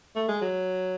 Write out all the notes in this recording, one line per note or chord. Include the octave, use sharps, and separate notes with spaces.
A3
G#3
F#3